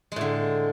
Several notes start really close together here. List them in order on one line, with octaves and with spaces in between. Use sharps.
G#3 A2 D3